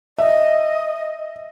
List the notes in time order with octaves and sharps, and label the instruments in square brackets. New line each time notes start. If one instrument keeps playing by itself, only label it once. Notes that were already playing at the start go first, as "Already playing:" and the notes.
[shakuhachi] D#5 [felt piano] E5